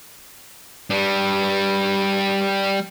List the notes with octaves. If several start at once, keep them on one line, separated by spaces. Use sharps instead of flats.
G3 D4